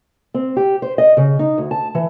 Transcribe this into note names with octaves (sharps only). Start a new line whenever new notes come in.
C4
G4
C5
D#5
C#3
D#4
D2
A5
E3